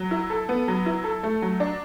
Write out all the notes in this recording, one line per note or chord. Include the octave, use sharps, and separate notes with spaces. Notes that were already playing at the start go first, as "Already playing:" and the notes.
Already playing: F#3
E4
A4
B3
F#3
E4
A4
A3
F#3
D4